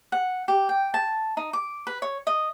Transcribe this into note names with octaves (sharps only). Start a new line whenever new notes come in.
F#5
G4
G5
A5
D#4
D6
B4
C#5
D#5